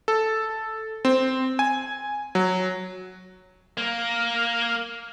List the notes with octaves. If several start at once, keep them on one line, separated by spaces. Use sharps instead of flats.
A4
C4
G#5
F#3
A#3